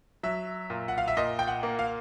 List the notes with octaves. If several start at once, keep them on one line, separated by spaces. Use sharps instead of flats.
F#3 E5
A#2
F#5
F5
E5
A#2 D#5
G5
F#5
A#3
F5